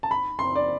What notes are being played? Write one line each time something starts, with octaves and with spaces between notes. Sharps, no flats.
A5
B5
C6
D5